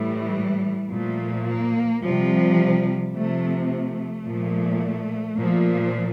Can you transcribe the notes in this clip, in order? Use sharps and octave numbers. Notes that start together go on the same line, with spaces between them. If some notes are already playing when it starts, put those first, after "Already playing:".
Already playing: A2 E3 G3
A#2 F3 A3
A#3
C3 F3 G3
C3 F3 A3
A3
A#2 F3
A#2 F3